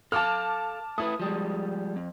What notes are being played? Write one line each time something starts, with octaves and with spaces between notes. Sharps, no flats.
A4 F5 A5 D6 F6
A3 E4 B4 D#6
F3 G3 G#3
F2